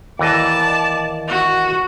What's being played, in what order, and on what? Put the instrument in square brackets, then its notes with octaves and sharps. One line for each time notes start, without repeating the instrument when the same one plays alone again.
[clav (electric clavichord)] D#2 E3 D#5 [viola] D5 A5
[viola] F#4